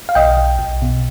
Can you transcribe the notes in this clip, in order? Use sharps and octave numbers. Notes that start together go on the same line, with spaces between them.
F5
B1 D#5 G5
B1
B1
B2